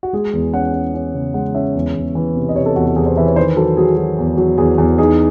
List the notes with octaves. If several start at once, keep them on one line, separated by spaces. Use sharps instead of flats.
F#4
G#3 G#4
E2
C#4 F#5
C#4
C#4
C#3
G#3 F#5
C#4 E5
E2
E2
E3
C3
D#5
C3 C#5
A4
E2 F#4
F#4
E2 G#4
C5
E3 E5
C#5
D#3 C5
F#3 A4
F#3 G#4
F#3
E2
F#3
E2 G#4
E2
D#4 G#4